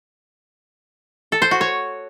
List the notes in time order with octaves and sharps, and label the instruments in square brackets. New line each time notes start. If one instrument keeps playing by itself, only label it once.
[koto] A4
C5
F#4
C#5